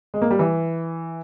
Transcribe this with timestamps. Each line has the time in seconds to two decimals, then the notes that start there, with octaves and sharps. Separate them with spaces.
0.14 G#3
0.22 A#3
0.31 G3
0.39 E3